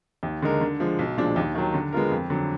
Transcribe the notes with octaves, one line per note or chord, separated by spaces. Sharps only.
D#2
D3 G#3 D#4 A#4
D3
F3 G#3
B1
A#2 F3 G#3 D4
D#2
D#3 F#3
D3
G#3 B3 F4 A#4
F2
D3 F#3